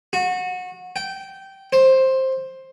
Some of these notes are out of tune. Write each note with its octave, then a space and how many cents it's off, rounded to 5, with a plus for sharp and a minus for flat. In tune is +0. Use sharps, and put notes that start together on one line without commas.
F#4 -25
G5 -15
C5 +10